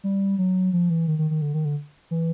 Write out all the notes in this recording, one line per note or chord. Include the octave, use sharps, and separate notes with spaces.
G3
F#3
F3
E3
D#3
D#3
D#3
D3
D#3
D3
E3